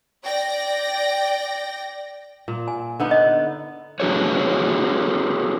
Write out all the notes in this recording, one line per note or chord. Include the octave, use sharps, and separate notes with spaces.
D5 G5 A#6
A#2
G#5
D3 B3 D#4
D#5
D4 F#4 G#4 A4 B4 C#5